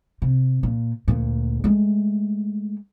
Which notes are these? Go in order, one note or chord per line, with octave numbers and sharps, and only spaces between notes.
C3
A#2
D2 A#2
G#3 A3